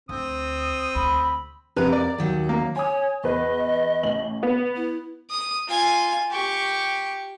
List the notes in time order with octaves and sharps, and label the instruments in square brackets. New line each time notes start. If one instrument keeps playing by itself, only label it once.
[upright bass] D2 [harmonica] C4 [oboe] D#6
[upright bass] D2 [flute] B5
[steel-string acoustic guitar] F2 A#4 [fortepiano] C3 B4 F#6
[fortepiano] D5
[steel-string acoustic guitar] D#2 D#3 F#3
[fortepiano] A#3
[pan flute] C#5 [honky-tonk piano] G#5 D#6
[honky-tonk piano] E2 B4 [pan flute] D#5
[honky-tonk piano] A1 F#7
B3
[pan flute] E4
[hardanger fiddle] D#6
F4 G#5
G4 C#6